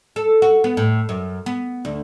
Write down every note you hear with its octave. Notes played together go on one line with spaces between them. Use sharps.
A4
F#4
B3
A2
F#2
B3
D2